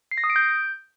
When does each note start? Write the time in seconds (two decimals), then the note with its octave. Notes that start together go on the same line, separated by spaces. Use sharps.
0.11 C7
0.18 A#6
0.24 D#6
0.30 D7
0.36 G6